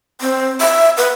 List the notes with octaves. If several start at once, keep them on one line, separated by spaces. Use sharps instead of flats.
C4
E5
B4